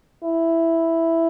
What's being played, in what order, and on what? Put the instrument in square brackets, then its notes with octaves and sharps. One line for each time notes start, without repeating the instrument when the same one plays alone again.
[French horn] E4